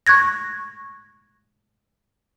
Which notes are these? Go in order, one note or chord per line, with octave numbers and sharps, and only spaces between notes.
C#6 F#6 G#6 A#6